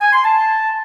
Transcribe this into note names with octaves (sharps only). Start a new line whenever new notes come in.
G#5
C6
A5